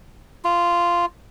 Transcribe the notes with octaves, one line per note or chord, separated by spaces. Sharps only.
F4